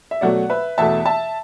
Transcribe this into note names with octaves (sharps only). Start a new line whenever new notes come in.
E5
B2 F#3 A3 D5 F#5
B4 E5
E2 B2 A3 E5 A5
E5 A5